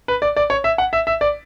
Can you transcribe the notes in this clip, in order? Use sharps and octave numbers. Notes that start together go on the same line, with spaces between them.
B4
D5
D5
C#5
E5
F#5
E5
E5
D5